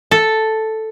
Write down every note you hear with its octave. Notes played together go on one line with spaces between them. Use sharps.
A4